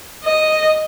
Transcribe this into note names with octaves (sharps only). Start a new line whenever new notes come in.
D#5